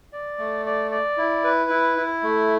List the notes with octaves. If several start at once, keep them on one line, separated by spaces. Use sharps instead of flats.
D5
A3
D5
D5
E4
B4
E4
E4
A3